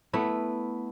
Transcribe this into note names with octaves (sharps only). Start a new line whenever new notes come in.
A3 B3 E4